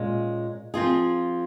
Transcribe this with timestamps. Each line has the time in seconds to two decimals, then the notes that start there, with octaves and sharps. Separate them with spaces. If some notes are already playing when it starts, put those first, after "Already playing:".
Already playing: A#2 G#3 C#4
0.74 F3 C4 F4 G#4